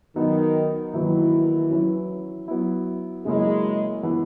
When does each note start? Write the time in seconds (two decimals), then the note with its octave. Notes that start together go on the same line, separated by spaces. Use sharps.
0.16 D#3 F#3 B3 D#4
0.93 D#3 E3 F#3 A#3 E4
1.70 F#3 C#4 E4
2.48 F#3 B3 E4
3.25 C#3 F#3 G#3 A#3 C#4 E4
4.03 E3 B3 E4